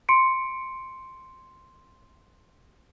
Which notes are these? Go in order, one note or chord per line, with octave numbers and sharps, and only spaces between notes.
C6 C#7 D7